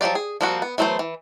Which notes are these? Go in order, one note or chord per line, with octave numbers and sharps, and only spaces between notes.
F3 F#3 A3 G4 D5
G#4
F3 G3 A#3 C4 F#4
B3
E3 F#3 A3 B3 C5
E3